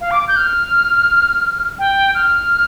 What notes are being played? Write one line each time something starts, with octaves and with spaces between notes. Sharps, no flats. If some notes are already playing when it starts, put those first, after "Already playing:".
F5
D6
G6
F6
G5
F6